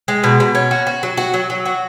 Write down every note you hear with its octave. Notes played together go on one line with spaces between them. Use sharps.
G#3
B2
B2
C#4
F#4
F#4
F#3
F#4
F#3
F#3
F#4